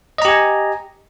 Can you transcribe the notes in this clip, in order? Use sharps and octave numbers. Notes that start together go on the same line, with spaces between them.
G4 D#5 G#5 A#5